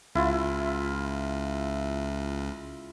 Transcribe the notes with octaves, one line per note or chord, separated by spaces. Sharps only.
C#2 E4 F4